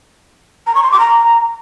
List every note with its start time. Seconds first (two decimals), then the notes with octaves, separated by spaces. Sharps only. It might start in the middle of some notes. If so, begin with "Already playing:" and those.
0.67 A#5
0.75 C#6
0.83 C6
0.91 D6
1.00 A#5